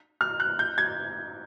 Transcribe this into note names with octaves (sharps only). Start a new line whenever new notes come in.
F6
F#6
G6
G#6